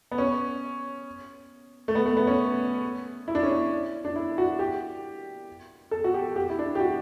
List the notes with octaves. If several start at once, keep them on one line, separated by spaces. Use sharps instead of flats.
B3
C#4
A3
B3
A3
B3
C#4
E4
D4
C#4
D4
D4
E4
F#4
G4
A4
F#4
G4
G4
E4
D4
G4
F#4